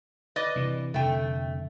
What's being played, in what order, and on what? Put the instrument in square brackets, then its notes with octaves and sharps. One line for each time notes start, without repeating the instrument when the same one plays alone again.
[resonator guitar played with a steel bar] B4 D5 D#5
[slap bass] C3 E3
[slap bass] F1 D3 [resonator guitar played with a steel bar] A3 G5